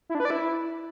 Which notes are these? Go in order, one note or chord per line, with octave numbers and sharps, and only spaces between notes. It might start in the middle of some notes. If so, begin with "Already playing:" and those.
E4
D4
B4
D5
E4